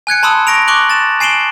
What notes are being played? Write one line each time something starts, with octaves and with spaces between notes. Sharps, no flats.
G#5 F#6 G#6 C#7
A5 B5 C6 D#6 E6
C#6 A#6 D7 F7
C#6 D6 F#6 F#7
A6 E7
G#5 C7 D7 E7 F#7 G7